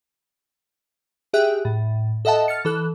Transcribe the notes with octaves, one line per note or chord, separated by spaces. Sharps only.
G4 G#4 E5 G5 F#6
A2
A4 D#5 E5 F#5 A5
F6 A6 C#7
E3 A4 F#6